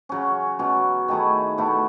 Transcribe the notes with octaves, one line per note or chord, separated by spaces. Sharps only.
C#3 F#3 C#4
B2 F#3 C#4
D#3 A3 E4 G#4
B2 A3 E4